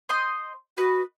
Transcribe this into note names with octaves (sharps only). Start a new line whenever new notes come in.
C5 D#5 C6
F#4 B4 D#5